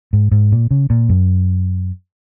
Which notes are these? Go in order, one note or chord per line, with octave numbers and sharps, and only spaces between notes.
G#2
G#2
A#2
C#3
A#2
F#2